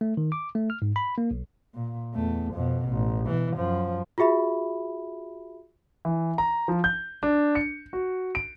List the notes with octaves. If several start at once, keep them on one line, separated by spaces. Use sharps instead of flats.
A3
D#3
D6
A3
F6
G#2
B5
A#3
B1
A#2
E2 A3
F2 B2
A1
B2 E3
F#2 F3
F4 F#4 G#4 E5 B5
E3
A#5
F3
G6
D4
C#7
F#4
D7